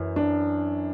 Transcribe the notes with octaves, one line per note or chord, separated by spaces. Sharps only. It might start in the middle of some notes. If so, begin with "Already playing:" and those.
Already playing: F#2 E3
D4